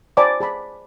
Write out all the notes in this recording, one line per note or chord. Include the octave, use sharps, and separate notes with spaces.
C5 D5 G#5 A5 B5 D6
G#4 A5 B5